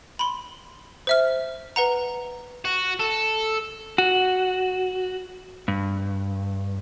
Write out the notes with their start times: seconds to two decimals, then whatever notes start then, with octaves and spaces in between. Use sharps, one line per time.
0.19 B5 C6
1.07 C5 E5 F6
1.76 B4 F#5 A#5
2.65 F#4
3.00 A4
3.98 F#4
5.68 G2